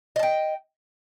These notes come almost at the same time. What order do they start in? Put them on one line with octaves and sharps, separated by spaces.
D#5 A5 G5